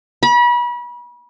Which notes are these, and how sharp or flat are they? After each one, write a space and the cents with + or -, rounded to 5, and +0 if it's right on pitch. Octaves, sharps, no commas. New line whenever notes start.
B5 -35